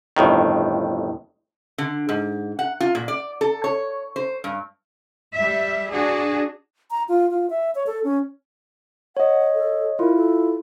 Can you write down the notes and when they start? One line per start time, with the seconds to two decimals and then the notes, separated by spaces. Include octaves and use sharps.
0.17 G1 F2 A2 D#3
1.78 D3
2.09 G#2
2.59 F#5
2.80 F4
2.95 A#2
3.08 D5
3.41 A4
3.64 C#5
4.16 C5
4.44 G2
5.35 G3 E5
5.92 D4 F#4 G#4
6.91 A#5
7.09 F4
7.31 F4
7.50 E5
7.75 C#5
7.87 A4
8.04 C#4
9.17 C#5 D#5 F#5
9.55 A4
9.99 E4 F4 A#4
10.16 A4